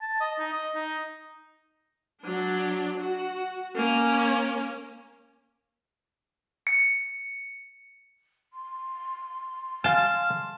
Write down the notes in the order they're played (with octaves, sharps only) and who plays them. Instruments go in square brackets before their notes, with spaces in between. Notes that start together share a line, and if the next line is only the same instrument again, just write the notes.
[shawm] A5
D#5
D#4
D#5
D#4
[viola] F#3 D4
F#4
A#3 C#4
[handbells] C#7
[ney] C6
[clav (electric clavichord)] F5 G#5 [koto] A5 [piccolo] F6